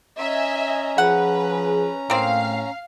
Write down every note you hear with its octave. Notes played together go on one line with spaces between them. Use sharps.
C#4 D#5 E5 G#5 A#5
F3 G#4 B4 F#5
A2 A#3 C4 F5